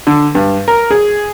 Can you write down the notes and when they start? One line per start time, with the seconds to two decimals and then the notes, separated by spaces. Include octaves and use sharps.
0.07 D3
0.35 G2
0.68 A#4
0.91 G#4